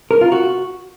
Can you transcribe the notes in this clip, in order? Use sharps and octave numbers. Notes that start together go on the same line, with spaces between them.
A#4
F4
F#4